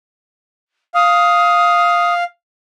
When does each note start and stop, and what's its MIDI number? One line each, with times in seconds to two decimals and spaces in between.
0.94 2.24 77
0.94 2.14 87